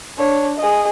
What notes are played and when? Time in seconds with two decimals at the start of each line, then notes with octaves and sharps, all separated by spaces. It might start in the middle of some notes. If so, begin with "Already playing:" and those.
0.18 D4 C#5
0.58 G#4 D#5